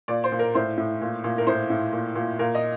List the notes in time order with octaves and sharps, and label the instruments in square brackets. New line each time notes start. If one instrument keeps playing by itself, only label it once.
[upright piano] A#2 D5
C5
A#2
A#4
A2 C5
A2
A#2
A#2
A#4
A2 C5
A2
A#2
A#2
A#2 A#4
D#5